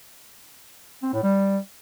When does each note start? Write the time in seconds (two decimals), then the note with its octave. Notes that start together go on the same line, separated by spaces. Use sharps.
1.03 C4
1.13 A2
1.23 G3